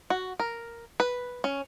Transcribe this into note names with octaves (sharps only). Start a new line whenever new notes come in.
F#4
A#4
B4
C#4